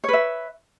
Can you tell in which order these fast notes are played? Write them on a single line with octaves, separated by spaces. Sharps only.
C#5 B4 E5